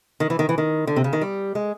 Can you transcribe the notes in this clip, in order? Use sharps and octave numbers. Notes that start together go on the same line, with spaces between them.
D#3
E3
D#3
E3
D#3
D3
C3
C#3
D#3
G3
G#3